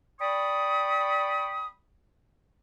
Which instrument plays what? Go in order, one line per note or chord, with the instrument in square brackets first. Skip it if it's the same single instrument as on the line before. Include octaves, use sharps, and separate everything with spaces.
[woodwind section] D5 G5 B5 C#6 D#6